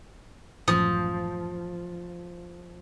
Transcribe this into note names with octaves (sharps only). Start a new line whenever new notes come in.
A1 F#2 F3 D#6